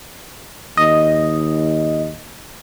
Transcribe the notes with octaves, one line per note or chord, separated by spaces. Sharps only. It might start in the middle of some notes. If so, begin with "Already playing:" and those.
D#2 D#5